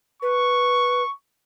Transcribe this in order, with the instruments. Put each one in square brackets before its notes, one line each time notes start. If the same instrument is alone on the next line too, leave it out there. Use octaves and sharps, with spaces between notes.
[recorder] B4 [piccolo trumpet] C#6